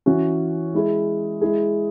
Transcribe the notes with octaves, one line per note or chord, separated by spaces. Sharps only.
E3 C#4 F#4
G#3 E4 G#4
G#3 E4 G#4